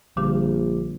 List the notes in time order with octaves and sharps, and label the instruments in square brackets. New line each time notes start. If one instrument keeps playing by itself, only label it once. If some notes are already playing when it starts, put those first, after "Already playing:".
[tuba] A#1 [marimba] D3 G3 G4